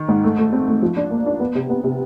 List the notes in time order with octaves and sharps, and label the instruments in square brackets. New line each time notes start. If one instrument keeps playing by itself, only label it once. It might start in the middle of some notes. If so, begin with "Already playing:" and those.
Already playing: [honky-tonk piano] D#3
G#2
A3
A3
C4
A3
F3
D4
A#3
D4
B3
C3
B3
C3